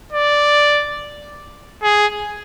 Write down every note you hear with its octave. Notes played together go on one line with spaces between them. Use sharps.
D5
G#4